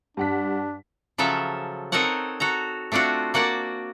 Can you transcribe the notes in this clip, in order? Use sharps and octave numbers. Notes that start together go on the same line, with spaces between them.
G2 D4 F#5 B6
C#3 F3 F#3 A4 E5
C4 D#4 A4 A#4 C#5 F#5
F#4 A4 A#5
A3 C4 D4 F4 F#4
A#3 F#4 D5 F#5 A5